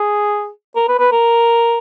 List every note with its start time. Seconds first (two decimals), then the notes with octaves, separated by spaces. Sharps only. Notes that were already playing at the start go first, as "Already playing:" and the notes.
Already playing: G#4
0.76 A#4
0.88 B4
0.99 B4
1.12 A#4